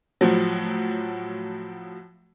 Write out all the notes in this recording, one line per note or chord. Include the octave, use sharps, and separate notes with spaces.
A2 F3 F#3